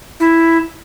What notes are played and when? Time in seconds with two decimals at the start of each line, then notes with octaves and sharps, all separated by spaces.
0.20 E4